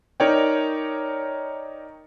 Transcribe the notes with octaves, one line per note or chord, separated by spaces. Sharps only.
D#4 A#4 C#5 D5 G5